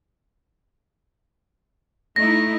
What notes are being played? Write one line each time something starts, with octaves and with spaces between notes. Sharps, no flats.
A3 D#4 E4 A#6